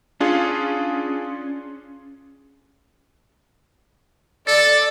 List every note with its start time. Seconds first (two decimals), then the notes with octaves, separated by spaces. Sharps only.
0.20 C#4 D4 F4 G#4
4.47 A4 D5